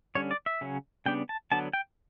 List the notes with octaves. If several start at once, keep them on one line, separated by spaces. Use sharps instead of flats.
D3 G3 C#4 C#5
D5
E5
C#3 F#3 C#4
C#3 G3 B3 D4 G5
A5
D3 F#3 B3 D4 A5
G5